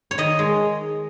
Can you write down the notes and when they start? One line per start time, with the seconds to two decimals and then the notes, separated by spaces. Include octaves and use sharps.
0.11 C#5
0.18 D#3 D#5
0.39 G#3